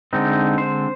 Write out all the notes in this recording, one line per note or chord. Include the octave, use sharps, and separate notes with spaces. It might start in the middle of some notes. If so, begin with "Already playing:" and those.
D3 G#3 C4 D#4
C5